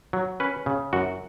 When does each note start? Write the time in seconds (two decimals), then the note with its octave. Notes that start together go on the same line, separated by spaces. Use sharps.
0.13 F#3
0.40 C#4 B4
0.66 C#3
0.93 F#2 F#4